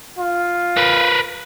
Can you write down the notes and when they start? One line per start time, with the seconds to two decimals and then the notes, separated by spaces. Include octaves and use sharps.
0.19 F4
0.77 A#4 B4